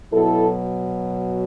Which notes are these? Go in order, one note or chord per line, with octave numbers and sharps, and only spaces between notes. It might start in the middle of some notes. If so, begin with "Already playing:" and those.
B2 F#3 E4 A4